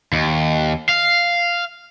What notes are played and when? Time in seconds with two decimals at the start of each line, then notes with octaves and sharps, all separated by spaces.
0.13 D#2
0.89 F5